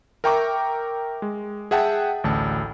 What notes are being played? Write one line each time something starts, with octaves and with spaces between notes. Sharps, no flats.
A#4 E5 G5 A#5 C#6 D6
G#3
G#4 E5 F#5 G5 A5
A1 D2 A5